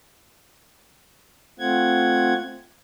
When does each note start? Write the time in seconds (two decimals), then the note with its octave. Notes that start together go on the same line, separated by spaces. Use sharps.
1.60 A3 C4 F4 F#5 G#6